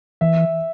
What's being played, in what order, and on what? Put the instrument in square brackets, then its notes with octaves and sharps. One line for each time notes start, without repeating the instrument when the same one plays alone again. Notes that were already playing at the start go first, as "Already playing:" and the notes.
[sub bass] E3 [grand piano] E5